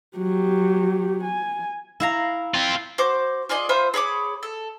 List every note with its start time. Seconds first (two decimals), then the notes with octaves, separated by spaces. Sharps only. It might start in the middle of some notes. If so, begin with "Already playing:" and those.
0.17 F#3 G4
1.23 G#5
2.00 E4 F5 A#5
2.54 C4 F4
2.98 F#4 C5 D6
3.49 F4 G#4 D5 D#5
3.69 F4 C5 E5 B5
3.94 G#4 C#5 B5 D6
4.43 A4